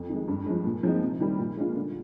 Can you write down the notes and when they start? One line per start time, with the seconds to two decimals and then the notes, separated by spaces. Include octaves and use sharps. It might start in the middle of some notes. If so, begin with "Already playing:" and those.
Already playing: F2
0.09 D#3 G#3
0.28 G2
0.46 F3 G#3
0.65 A#2
0.83 F3 G#3 C4 D#4
1.02 C3
1.20 D#3 G3
1.39 A#2
1.57 G#3 D4 F4
1.76 D3